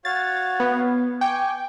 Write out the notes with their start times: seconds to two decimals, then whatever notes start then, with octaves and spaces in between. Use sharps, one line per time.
0.05 F#4 C#5 F5 A6
0.60 B3
1.21 G5 G#5 C#6 D6